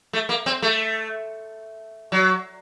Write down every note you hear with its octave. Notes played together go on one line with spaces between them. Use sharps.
A3
A#3
C4
A3
F#3